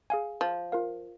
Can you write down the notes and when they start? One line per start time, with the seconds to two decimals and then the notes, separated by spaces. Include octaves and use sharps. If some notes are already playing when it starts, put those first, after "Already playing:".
0.10 G#4 F5 G#5
0.41 F3
0.72 F4 A#4 F5